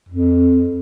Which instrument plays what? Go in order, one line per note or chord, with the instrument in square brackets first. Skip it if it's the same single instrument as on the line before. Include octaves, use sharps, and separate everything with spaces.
[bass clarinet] F2